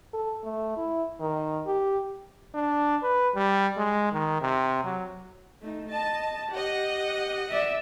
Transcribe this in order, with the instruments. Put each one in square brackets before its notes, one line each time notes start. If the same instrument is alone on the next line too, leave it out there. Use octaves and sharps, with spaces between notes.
[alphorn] A4
A3
E4
D#3
G4
[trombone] D4
B4
G3
G#3
D#3
C3
F#3
[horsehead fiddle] A3 D#4
[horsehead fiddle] D#5 [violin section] A5
[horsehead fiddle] G4 [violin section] D#5 F#5
[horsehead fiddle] D5 E5